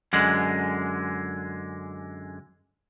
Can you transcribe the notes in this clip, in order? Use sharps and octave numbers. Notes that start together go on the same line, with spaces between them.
F#2 D3 G#3